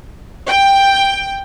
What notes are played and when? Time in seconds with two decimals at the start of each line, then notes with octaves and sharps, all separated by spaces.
0.48 G5